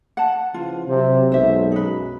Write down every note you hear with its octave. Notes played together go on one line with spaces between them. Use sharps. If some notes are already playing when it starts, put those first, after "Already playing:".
F#5 A5
C#3 E3 F3 F4
C3 F#3 C5
B1 F#2 G#3 C#4 C5 E5
D#4 B4